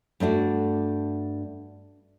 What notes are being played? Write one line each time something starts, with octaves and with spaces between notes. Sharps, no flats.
G2 A3 D4 F#4